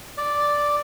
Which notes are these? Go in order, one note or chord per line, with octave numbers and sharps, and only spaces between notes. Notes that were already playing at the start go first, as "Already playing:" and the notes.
D5